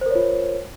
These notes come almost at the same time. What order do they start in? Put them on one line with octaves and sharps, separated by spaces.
C5 A#4 C#5 F4